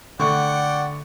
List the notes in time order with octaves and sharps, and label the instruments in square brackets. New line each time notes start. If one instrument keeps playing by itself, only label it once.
[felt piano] D3 A3 C#6 [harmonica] D5 F#5 G5